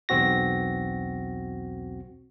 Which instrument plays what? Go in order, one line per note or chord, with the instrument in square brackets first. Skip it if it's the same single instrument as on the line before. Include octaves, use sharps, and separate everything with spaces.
[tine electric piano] B1 E2 C4 F#4 A#6